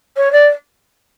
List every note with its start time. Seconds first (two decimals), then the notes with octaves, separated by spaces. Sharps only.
0.17 C#5
0.32 D5